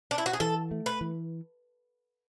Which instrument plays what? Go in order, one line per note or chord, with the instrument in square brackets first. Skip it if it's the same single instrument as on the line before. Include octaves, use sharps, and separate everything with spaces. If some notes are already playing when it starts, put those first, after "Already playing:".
[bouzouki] D4
E4
F#4
G#4
[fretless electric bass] E3 [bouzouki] A4
[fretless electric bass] A3
[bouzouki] B4
[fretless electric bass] E3